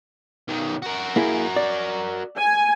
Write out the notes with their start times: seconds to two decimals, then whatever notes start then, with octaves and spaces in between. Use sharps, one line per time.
0.48 B1 D#3
0.82 F#4 A#4
1.16 A#3 E4 G#4
1.56 D5
2.37 G#5